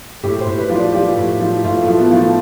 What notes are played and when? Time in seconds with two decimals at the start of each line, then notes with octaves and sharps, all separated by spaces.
0.23 A2 G4
0.41 C5
0.47 A2
0.58 B4
0.70 F3
0.76 D5
0.93 F3 G4
1.16 A2
1.40 F3
1.64 A2 F4
1.81 A3
1.88 F3
1.99 B3
2.11 F3
2.16 A3